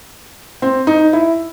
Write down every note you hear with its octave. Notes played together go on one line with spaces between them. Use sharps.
C4
D#4
E4